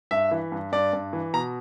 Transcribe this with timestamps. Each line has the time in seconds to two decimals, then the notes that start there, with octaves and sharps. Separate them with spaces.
0.11 G2 E5
0.31 E3
0.52 G2
0.72 G2 D5
0.93 G2
1.13 E3
1.33 B2 A#5